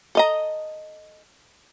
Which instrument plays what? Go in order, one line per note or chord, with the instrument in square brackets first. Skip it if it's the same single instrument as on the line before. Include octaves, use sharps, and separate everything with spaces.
[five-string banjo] A4 D#5 A#5